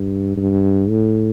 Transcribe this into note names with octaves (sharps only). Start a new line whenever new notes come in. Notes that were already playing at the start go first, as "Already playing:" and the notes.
Already playing: G2
G2
A2